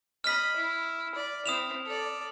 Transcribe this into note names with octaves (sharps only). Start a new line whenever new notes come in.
D#5 B5 F6 B6
E4
D5
C4 E4 D#6 E7 F7
A4 D5